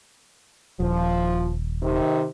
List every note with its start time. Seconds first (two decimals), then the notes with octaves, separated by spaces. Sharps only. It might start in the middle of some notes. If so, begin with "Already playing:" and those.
0.80 D#1 F3
1.83 C3 D#3